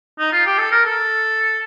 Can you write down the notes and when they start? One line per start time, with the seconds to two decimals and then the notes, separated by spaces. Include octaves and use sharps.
0.19 D#4
0.33 F4
0.46 G4
0.58 A4
0.72 A#4
0.85 A4